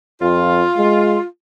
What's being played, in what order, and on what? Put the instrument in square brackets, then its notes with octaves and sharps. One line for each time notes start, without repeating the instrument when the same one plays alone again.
[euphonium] F2 [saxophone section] F4
[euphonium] G#3